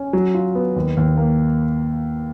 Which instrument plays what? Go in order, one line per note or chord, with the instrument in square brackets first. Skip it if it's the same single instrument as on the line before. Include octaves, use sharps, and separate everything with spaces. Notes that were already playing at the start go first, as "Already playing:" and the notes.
Already playing: [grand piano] C#4
F#3
F4
B3
D#2
D#2
A#3